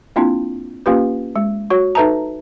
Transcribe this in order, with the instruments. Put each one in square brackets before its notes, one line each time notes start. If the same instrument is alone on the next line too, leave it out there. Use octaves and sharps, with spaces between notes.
[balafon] A#3 C4 D4 E4 F4
A#3 C#4 F4 G4 B4
G#3
F#4 C#5
D#4 A4 B4 E5 A5 A#5